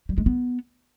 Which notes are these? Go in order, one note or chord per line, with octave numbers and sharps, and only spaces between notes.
G3
G#3
B3